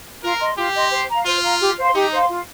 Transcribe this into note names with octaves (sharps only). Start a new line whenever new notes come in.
F4 A#4
D#5 C6
F4 G4
D#5 C6
C5
F5 A#5
F4 C5
F5 A#5
G4
C5 F5 C6
D#4 G4
C5 F5 C6
F4